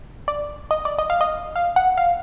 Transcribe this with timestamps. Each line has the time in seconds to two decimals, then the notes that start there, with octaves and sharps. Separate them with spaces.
0.28 D5
0.71 D#5
0.85 D5
0.99 D#5
1.10 F5
1.21 D#5
1.56 F5
1.76 F#5
1.98 F5